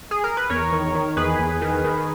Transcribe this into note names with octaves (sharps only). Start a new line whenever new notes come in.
G#4
A#4
B4
E2 A#4 C#5
D#3
D#3
E2 G#4 B4
E2
D#3
D#3